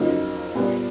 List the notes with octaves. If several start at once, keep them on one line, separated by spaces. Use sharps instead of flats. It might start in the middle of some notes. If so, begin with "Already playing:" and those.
Already playing: F2 C#3 F#3 A#3 D#4
A#2 G3 B3